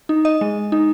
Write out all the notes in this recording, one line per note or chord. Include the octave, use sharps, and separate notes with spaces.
D#4
D#5
G#3
D#4